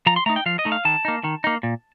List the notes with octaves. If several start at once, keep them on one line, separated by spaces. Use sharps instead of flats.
F3 A#5
C6
A3 D#4 A#5
G5
F3 F5
D#5
A3 D#4
F5
D#3 A5
A#3 D#4
D#3
A#3 D#4
A#2